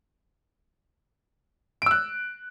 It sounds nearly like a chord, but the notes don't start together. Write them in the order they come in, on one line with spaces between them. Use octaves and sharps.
D7 E6 F#6